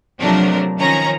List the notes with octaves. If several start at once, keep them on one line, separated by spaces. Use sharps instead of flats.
C3 F3 F#3 A3 D4 A#4
D#3 F3 C#4 A#5